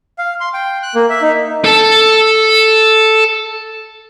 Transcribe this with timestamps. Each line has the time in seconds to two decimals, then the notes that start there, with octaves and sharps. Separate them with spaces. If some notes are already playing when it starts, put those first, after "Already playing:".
0.18 F5
0.40 C6
0.54 G5
0.83 F#6
0.95 A#3
1.10 E5
1.22 D#4
1.64 A4 A5